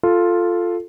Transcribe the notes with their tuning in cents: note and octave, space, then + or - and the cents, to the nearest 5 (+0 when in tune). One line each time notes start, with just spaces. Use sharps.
F4 +0 A4 +0